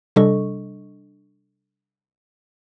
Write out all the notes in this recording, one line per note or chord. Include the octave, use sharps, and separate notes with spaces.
C3 G3 D4 A4 D#5 C#6